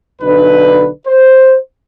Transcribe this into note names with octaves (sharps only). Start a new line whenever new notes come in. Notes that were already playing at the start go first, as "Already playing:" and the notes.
B1 D3 D4 D#4 B4
C5